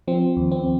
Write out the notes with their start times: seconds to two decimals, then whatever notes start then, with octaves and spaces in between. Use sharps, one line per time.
0.08 F3 C4
0.37 D#2
0.51 C4